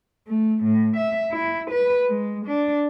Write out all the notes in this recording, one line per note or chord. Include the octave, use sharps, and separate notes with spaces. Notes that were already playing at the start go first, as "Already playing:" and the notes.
A3
A2
E5
E4
B4
G#3
D4